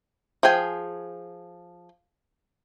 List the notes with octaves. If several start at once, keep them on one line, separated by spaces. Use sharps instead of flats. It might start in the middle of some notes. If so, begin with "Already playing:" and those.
F3 G#4 G5 G#5